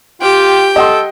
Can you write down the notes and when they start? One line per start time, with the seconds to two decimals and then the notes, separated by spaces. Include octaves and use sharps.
0.21 F4 G4 G5
0.76 A4 D#5 F#5 C6